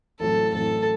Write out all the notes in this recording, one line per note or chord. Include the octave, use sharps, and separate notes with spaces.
A1 A2 F#3 C4 A4
A1 A2 F#3 C4 A4